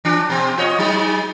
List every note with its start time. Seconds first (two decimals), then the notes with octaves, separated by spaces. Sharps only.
0.05 E3 D4
0.29 B2 C4
0.57 F4 C#5 D#5
0.79 F#3 G#3 D#4